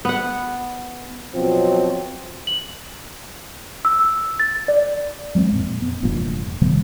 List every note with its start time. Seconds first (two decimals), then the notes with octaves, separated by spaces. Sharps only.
0.05 B3 F#5
1.34 B2 F3 F#3 C4
2.47 F#7
3.85 E6
4.40 A6
4.68 D5
5.35 F#3 G#3 B3 C4
5.52 F2 A#2
5.82 B3
6.03 F1 E2 G2 A#2
6.61 C3 D#3 G3 B3